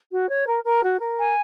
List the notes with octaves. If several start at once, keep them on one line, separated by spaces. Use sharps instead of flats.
F#4
C#5
A#4
A#4
F#4
A#4
G#5